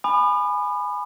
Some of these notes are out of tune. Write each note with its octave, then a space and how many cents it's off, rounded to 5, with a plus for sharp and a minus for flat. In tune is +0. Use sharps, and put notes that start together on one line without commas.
G#5 +0 B5 +5 D#6 -45